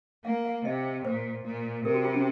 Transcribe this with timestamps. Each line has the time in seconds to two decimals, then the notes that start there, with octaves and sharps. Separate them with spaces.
0.25 A#3 F5
0.45 F5
0.65 C3 D#5
1.05 A#2 C5
1.45 A#2
1.85 C3 A#4
1.94 F#4
2.05 F4
2.14 C#4